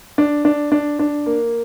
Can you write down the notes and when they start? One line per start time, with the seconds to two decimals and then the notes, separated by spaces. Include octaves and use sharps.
0.18 D4
0.45 D4
0.72 D4
0.99 D4
1.26 A#3